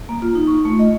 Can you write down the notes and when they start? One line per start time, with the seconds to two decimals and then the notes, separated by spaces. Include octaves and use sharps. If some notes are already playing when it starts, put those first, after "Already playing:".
0.09 A#3
0.22 F4
0.35 D#4
0.47 C#6
0.65 A3
0.79 D#5